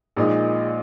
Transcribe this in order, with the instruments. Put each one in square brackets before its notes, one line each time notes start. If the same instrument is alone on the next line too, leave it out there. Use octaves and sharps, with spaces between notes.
[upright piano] A#1 A#2 G#3 D#4